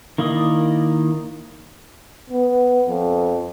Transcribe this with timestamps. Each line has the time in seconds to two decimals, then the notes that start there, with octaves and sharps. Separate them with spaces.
0.18 D#3 A#3 E4 D5 D#5
2.30 B3
2.89 F2